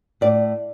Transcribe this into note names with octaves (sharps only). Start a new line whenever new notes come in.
A2 D5